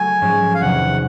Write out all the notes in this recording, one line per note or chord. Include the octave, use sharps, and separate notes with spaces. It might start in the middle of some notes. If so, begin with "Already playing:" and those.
Already playing: F#3 A3 G#5
G#2 F3 G#3 C#4 F4
F5
E2 C3 D#3 F#3 F#5